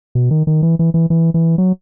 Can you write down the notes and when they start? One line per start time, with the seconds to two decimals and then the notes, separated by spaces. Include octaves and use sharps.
0.15 B2
0.31 D#3
0.47 D#3
0.62 E3
0.79 E3
0.94 E3
1.10 E3
1.34 E3
1.58 F#3